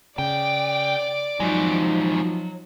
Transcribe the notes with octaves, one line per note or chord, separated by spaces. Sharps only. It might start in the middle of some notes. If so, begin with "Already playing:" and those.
C#3 D5 G5 D6
F3 F#3 G#3 D#4 F#4